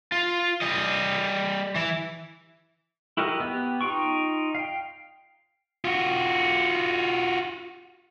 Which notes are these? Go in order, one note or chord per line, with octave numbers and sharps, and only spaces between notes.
F4
G3 D#5
E3 E4
E4 F#4 G4 A#4 D#5
B3 G4
D#4 F4 G5 C#6
F5 G5
F4 F#4